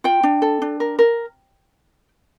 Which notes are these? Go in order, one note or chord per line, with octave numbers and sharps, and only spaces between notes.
F4 G5
D4
A4
D4
A#4
A#4